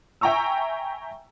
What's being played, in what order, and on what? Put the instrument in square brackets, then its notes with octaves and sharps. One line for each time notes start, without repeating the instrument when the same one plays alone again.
[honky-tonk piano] E5 G5 G#5 A#5 C#6 E6